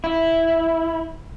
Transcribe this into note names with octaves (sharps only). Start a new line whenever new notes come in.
E4